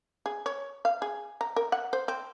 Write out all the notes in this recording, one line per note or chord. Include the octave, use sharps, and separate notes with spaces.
G#4
C#5
F5
G#4
A#5
A#4
F#5
C5
C4